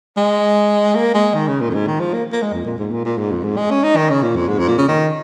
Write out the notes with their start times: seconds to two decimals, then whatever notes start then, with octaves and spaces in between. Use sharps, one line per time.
0.17 G#3
0.95 A#3
1.14 G#3
1.35 D#3
1.48 C#3
1.60 A#2
1.70 F2
1.74 G#2
1.87 D#3
2.00 F3
2.14 A#3
2.32 A#3
2.42 G#3
2.53 F2
2.65 A#2
2.78 G#2
2.91 A#2
3.05 A#2
3.18 G#2
3.31 F2
3.44 G#2
3.57 G#3
3.71 C#4
3.83 D#4
3.96 D#3
4.10 C#3
4.23 A#2
4.36 F2
4.48 G#2
4.59 F2
4.68 A#2
4.78 C#3
4.88 D#3